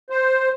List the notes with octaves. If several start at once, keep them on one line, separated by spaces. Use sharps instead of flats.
C5